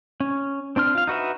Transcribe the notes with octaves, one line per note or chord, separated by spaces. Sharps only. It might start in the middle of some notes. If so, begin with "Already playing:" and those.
C#4
C4 D4 C6 F6
F4 F5
D#4 F#4 B4 E5